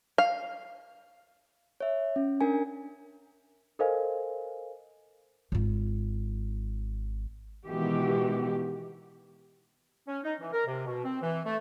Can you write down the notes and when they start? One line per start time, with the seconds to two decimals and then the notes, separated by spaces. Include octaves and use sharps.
0.18 F5
1.81 C#5 E5
2.16 C#4
2.41 D4 A#4 G#5
3.79 A4 A#4 C5 D#5 F5 G#5
5.52 G#1 F4
7.65 B2 D#3 E3 G#3 F#4 G4
10.07 C#4
10.24 D#4
10.40 E3
10.53 A#4
10.67 C3
10.86 B2
11.04 C4
11.22 E3
11.45 A3